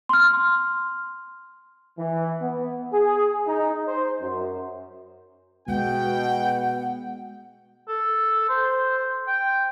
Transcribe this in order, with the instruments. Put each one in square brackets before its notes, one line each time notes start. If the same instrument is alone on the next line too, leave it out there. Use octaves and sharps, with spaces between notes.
[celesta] C6 F6
[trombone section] E3
B3
G#4
D#4
C5
F#2
[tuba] B2 [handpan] G#3 B3 [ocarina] F#5 [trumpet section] G5
[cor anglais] A4
C5
G5